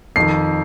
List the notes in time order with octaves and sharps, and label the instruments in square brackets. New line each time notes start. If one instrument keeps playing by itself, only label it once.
[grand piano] F2 D#3 C7